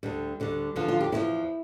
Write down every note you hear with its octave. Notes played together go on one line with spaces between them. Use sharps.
D2 D3 G3
D2 D3 G3
E2 D3 F3 F4
F4
G4
E2 D3 F3 E4